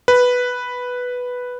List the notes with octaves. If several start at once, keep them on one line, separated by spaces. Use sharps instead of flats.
B4